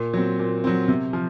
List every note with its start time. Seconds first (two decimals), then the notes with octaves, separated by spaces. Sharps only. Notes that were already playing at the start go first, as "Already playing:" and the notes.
Already playing: A#2
0.14 F#3 C4
0.39 A#2
0.64 F#3 C4
0.88 C3
1.13 F3